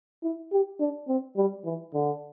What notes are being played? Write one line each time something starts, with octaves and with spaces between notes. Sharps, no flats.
E4
G4
D4
C4
G3
E3
D3